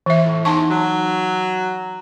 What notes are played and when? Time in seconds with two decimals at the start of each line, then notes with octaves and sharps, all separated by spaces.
0.06 E3 E5
0.25 A2
0.45 E2 D#4 A5 C#6
0.70 F#3